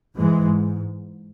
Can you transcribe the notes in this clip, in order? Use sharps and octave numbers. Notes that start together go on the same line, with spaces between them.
G#2 E3 G#3